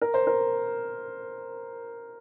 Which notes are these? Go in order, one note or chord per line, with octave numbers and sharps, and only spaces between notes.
A#4
C5
A#4